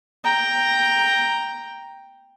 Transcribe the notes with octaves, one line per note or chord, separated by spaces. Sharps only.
G5 A#5